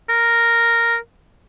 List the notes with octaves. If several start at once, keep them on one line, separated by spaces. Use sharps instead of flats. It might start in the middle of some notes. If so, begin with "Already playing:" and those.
A#4